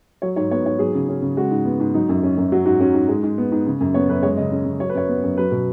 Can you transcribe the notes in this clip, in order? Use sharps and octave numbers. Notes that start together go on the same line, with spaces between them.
F#3 C#5
G#2 C#5
B3 C#5
G#2 C#5
F#3 G#4
C#3
C#4
C#3
G#3 F#4
G#2
B3
G#2
F#3 D#4
F#2
C#4
F#2
F#3 F#4
G#2 F#4
C#4 F#4
G#2
G#3
G#2
B3
G#2
C#3
F#2
B3 C#5
F#2 B4
G#3 C#5
C#3 D#5
C#4
C#3
F#3 C#5
B4
F#2 C#5
B3
F#2
F#3 B4
B2